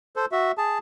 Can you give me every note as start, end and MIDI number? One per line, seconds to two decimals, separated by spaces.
0.16 0.26 69
0.16 0.26 72
0.32 0.52 66
0.32 0.52 76
0.58 0.78 68
0.58 0.78 81